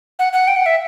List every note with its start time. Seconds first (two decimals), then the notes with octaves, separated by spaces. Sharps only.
0.19 F#5
0.33 F#5
0.48 G5
0.56 F#5
0.66 E5